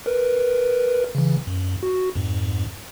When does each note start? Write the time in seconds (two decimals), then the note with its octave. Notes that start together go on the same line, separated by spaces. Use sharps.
0.06 A#4 B4
1.15 C#3 E3
1.47 F#2
1.83 F#4
2.15 F2 G#2